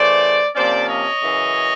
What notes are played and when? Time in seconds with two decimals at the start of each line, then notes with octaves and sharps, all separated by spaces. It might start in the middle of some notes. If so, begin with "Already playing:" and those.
Already playing: C#3 E3 A3 C5 D5
0.55 C3 F3 A#3 C#4 C5 D5
0.89 C#5 D#5
1.21 F#2 C#3 E3